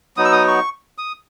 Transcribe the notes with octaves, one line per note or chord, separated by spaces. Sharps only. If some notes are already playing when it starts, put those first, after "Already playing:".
F#3 B3 D#4 D#6
E6
D#6
C#6
D#6